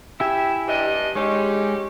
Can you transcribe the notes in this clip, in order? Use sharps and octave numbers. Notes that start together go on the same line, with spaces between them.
E4 G4 E5 G#5
G2 D4 D#5
G#3 C#4 D#4 G4